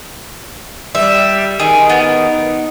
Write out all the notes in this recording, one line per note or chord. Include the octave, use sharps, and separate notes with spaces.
G3 E5
D#3 G#4
B3